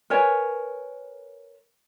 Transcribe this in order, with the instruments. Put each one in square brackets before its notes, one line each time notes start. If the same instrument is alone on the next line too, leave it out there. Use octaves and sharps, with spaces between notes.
[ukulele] A#4 B4 C#5 G#5